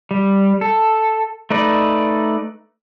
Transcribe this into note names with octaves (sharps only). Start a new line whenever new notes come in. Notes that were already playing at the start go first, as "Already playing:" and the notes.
G3
A4
A3 D#4 B4 D5